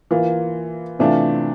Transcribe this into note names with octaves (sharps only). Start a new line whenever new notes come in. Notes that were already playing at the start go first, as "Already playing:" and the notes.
E3 A#3 F4
C3 E3 A3 D4 F4